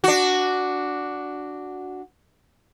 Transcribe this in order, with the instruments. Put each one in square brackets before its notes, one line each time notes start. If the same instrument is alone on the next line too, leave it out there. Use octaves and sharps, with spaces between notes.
[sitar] D4 F#4